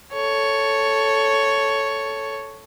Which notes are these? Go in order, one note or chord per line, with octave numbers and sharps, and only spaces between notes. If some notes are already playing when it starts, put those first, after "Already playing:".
A4 C#5